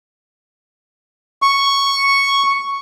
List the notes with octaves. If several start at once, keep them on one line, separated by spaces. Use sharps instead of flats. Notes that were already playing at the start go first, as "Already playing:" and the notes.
C#6